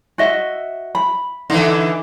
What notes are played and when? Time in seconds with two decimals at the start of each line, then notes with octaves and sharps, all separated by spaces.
0.18 F#4 D#5 E5
0.95 B5
1.50 D3 E3 D#4